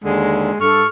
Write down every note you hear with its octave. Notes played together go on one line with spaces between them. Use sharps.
D#2 D3 G#3
G2 A4 C#6 F6